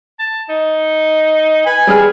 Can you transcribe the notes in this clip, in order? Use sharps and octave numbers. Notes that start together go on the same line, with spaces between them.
A5
D#4
B4 G#5
G3 G#4 F6